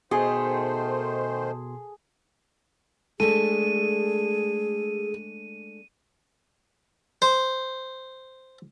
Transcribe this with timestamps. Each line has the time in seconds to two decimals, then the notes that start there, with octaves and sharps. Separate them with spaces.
0.11 B2 D#3 A3 G#4 C5 C6
3.20 G#3 A3 D4 G#4 A4 D#7
7.22 C5